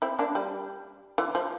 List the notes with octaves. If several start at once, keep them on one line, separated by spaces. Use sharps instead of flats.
C4 E4
A#3 D4
G3
E3
F3